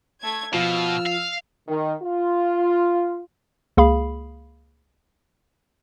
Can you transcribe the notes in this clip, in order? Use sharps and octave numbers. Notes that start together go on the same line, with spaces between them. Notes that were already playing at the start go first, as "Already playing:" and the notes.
A3 G#6
B2 F3 F4 E6 F6
F5
D#3
F4
C#2 A#3 G#4 F5 B5